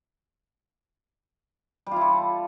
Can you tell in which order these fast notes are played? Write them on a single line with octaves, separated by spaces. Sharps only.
G3 F4 E4 A4